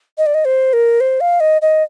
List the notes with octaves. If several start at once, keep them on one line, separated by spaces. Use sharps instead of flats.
D#5
D5
D#5
C5
A#4
C5
F5
D#5
D#5